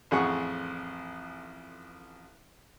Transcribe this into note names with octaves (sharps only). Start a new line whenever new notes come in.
A1 F2 G#4 F#5 C#6